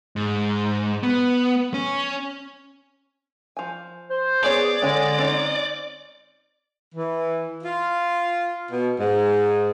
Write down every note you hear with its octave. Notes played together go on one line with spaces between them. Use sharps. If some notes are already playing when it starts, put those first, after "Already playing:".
G#2
B3
C#4
F3 G#5
C5
B3 C#4 G#4 C#5 D5
D3 G#3 C#4 G#5
C4 C#4 D#4
E3
F4
B2
G#2